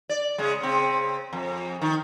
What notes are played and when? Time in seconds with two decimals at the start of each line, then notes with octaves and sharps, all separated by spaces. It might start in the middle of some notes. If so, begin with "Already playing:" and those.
0.09 D5
0.38 C#3 G#3
0.61 C#3 C4
1.33 F2
1.81 D#3